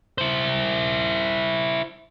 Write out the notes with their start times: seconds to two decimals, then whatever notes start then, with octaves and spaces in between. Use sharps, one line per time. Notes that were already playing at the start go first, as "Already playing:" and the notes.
0.18 E4 C5